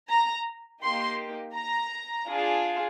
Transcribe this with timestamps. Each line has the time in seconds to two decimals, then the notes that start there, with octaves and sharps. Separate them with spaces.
0.09 A#5
0.82 A#3 D#4 G4 C6
1.55 A#5
2.29 D4 F4 G#4